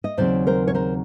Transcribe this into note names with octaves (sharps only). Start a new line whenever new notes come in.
D#5
D#2 C#3 F#3 C4 C5 D5
A#4 C5
C#5
A#4 C5